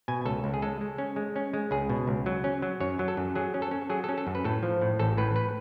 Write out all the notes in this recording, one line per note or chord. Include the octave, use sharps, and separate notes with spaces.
B2 G#5
C#2 A4
C#2
G#4
G#3 A4
G#3
C#4
G#3
C#4
G#3
C#2 G#4
B2
C#2
F#3
C#4
F#3
F#2 C#5
F#3
A4
F#2
F#3 G#4
C#4
A4
C#4
F#3 G#4
A4
C#4
A4
F#2
B4
A2 A4
F3
A2
A1 A4
A2 B4
B4